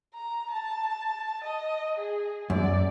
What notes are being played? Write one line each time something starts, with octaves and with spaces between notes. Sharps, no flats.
A#5
A5
D#5
G#4
F#2 D5